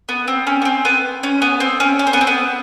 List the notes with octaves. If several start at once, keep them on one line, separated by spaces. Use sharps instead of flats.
B3
C4
C#4
B3
C4
B3
C#4
B3
C4
C#4
C#4
C4
B3
C4
B3